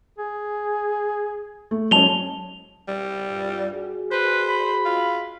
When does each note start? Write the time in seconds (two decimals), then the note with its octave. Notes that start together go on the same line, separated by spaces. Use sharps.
0.18 G#4
1.71 A3
1.91 F#3 G#3 C#4 A5 F7 G7
2.88 G3
3.29 G2 F4
3.72 F#4 G#4
4.12 B4 C5
4.49 B5
4.85 F4